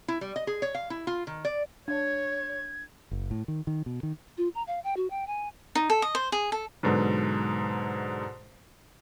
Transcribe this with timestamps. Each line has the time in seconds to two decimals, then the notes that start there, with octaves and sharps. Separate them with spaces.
0.08 E4
0.21 G3
0.36 D#5
0.47 G#4
0.62 C#5
0.75 F5
0.90 E4
1.07 F4
1.27 D#3
1.45 D5
1.88 D4 C#5 G#6
3.11 F#1
3.31 A2
3.48 D#3
3.67 D#3
3.86 B2
4.03 D#3
4.38 F4
4.55 A#5
4.67 F5
4.84 G5
4.97 F#4
5.10 G5
5.27 G#5
5.75 D#4
5.90 A4
6.02 D#5
6.15 C5
6.32 G#4
6.52 A4
6.83 G#2 B2 D3 F#3